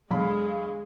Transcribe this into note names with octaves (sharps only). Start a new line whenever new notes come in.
E2 D3 F#3 G#3 F5 B5